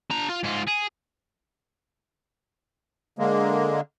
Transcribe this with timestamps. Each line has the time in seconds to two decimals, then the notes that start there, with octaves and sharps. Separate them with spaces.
0.10 D4 A#5
0.29 F4
0.43 G#2 F4
0.67 G#4
3.19 D3 G#3 A#3